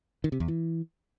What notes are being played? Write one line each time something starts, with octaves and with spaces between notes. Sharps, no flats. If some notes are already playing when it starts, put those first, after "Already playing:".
D#3
C3
E2
E3